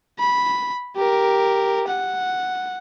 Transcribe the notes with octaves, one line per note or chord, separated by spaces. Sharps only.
B5
G4 A#4
F#5